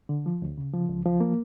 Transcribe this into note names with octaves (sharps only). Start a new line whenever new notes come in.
D3
F3
D2
C#3
F3
C#2
F3
A#3